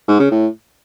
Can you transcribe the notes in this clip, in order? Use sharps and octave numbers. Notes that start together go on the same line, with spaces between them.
G#2
C#3
A2